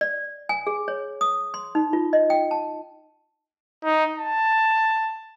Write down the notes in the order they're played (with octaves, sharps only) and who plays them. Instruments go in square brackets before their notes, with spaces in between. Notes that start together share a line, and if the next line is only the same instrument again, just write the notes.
[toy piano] D5
G#5
G#4
C#5
D#6
C6
D#4
F4
D#5
G5
A5
[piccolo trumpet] D#4
A5